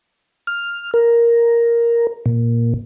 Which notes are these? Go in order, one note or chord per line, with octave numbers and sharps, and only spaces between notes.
F6
A#4
A#2